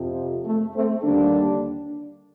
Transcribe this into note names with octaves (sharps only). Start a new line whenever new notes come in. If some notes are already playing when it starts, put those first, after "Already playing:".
Already playing: F2 C3 F3
A3
A3 C4
D#2 D3 G3 A#3 D4